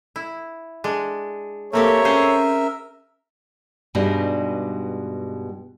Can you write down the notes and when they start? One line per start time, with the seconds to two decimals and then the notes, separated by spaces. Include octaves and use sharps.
0.16 E4
0.84 G#3 D4
1.73 A3 A#3 C4 G4 A#4 C#5 E5
2.05 C#4 G#4 C5
3.95 G2 B2 G3 G#3 D#4